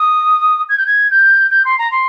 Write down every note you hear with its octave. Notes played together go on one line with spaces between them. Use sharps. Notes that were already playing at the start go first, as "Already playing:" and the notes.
Already playing: D#6
G#6
G6
G#6
G6
G6
C6
A#5
C6